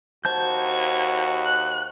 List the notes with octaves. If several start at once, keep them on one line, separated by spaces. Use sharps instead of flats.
D#2 F#4 C5 A5 G6 G#6
F#6